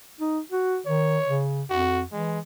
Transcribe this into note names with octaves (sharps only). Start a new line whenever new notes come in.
D#4
F#4
D#3 C#5
C#3
F2 F#4
E3 G#3